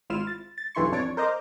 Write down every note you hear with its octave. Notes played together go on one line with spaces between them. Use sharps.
G#1 E4 F4 F6 E7
A6
A6
B1 G2 E3 E4 C6 C#6
F2 D4 C#5 A6 D7
A#4 C5 D#5 A#5 D6